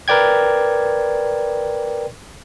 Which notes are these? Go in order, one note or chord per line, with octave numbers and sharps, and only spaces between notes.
A#4 B4 D5 G5 G#6